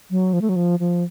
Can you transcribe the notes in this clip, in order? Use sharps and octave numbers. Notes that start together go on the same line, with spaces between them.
F#3
F3
A3
F#3
F3
F3